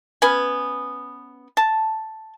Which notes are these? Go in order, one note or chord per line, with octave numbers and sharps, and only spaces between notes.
B3 C#4 B4 G#5
A5